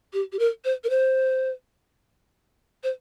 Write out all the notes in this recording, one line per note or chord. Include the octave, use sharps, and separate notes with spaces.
G4
G4
A#4
C5
A#4
C5
C5